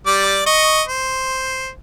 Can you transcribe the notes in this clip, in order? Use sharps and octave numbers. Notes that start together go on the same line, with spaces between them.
G3 D5 D6
D#5 C#6
C5